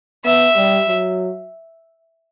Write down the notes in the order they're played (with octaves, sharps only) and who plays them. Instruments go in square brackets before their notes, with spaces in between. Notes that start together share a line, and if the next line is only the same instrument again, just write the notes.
[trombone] B3 [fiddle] E5
[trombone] G3
F#3